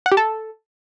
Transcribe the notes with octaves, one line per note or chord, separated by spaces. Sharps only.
F#5
G4
A4